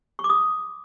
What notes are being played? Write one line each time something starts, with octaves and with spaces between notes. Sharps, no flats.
C#6
D6
D#6